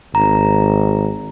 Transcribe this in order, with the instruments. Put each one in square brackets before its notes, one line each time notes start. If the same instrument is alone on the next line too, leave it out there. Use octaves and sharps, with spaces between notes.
[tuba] G#1 [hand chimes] A#5